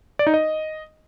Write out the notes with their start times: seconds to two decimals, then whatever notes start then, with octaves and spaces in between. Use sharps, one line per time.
0.19 D5
0.27 D#4
0.34 D#5